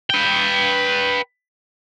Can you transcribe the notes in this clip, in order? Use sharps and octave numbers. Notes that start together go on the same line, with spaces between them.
B4 G5